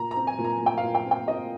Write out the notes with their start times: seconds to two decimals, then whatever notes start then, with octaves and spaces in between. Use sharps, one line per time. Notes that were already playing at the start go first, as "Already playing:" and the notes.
Already playing: A#2 A#5
0.11 A#5
0.16 C4
0.27 G#5
0.38 A#2
0.44 A#5
0.61 A#2
0.66 G5
0.77 F5
0.83 A#2
0.95 G5
1.05 C4
1.11 G5
1.28 C4 D#5